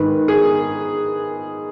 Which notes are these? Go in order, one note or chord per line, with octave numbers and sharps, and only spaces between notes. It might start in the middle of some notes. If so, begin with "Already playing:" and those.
Already playing: G#2 D#3 B4
G#4